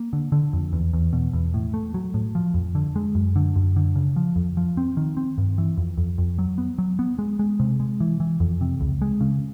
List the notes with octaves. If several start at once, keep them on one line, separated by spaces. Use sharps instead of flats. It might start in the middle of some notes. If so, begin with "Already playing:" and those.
Already playing: A#3
D3
D3
F2
E2
E2
B2
E2
A2
A3
F#3
A2
F3
F2
D3
G#3
F#2
D3
F#2
D3
C#3
F3
F2
F3
C4
D#3
C4
G2
E3
F2
F2
F2
F#3
B3
F#3
B3
G#3
G#3
C3
G#3
E3
E3
F2
C3
C#2
G#3
C#3